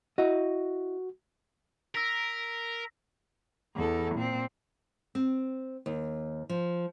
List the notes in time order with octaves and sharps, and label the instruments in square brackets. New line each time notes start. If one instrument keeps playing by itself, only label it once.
[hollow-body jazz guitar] E4 D#5 [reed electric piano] F#4
[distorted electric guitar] A#4 [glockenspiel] E6 A#6 B6
[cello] E2 A4
A#2 C4
[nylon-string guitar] C4
D#2
F3